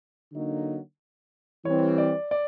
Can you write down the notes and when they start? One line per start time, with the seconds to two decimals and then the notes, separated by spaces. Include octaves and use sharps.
0.32 D3 F#3 A#3 D#4
1.65 E3 G3 C4 C#5
1.98 D5
2.31 D5